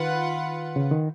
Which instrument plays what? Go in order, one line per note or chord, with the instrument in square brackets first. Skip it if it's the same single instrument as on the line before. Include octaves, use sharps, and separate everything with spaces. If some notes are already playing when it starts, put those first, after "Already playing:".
Already playing: [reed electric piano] D#3 [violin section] F4 B4 F#5
[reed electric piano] C#3
D#3